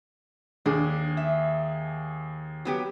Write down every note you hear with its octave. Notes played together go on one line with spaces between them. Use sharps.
D#2 D4 G#4
E5
F#3 B3 G4